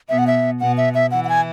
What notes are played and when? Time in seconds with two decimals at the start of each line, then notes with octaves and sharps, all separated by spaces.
0.09 B2 B3 E5
0.18 F#5
0.27 E5
0.60 B2 B3 F#5
0.77 E5
0.95 E5
1.11 E3 E4 F#5
1.24 F#5
1.29 G#5